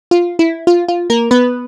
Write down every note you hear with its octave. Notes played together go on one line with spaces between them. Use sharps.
F4
E4
F4
F4
A#3 A#4
B3 B4